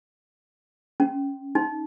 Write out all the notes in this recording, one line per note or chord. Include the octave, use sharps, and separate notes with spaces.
C#4
D#4